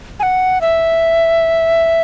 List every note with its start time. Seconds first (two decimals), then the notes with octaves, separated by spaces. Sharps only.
0.20 G#5
0.23 F#5
0.61 E5